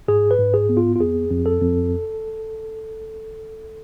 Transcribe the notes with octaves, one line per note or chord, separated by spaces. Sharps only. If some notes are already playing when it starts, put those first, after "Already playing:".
G#2 G#4
B4
G#2
G#4
B3
F4
F4
F2 G#4
F2
A4
F2